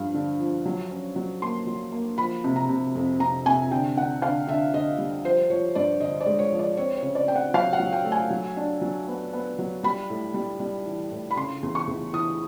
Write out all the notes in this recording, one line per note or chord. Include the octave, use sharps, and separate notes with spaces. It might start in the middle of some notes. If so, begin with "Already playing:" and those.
Already playing: G2 F3 F5
D3
F3
F#3
C#4
F#3
A#3 C6
F#3
A#3
F3 B5
C3
A#5
C3
F2
C3 A#5
C3 G#5
D3 G5
D3 F#5
D3 F5
D3 E5
D3 D#5
G3
F3 C5
F3 C#5
G2 D5
D3 D#5
D5
G#3
C#5
F3
D5
C4 C#5
C#5
C#3
D5
C4 G5
F#5
F#3 F5
F#5
F#3
G5
A3
G#5
F#3
D4
F#3
B3
B3
F#3
G3 B5
A2
G3
G3
E3
A2
B5
C#3 C6
E2
C#6
E2
E3 D#6